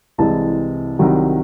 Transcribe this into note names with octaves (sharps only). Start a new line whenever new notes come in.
C2 C3 E3 G#3 A5
C2 C3 D#3 F#3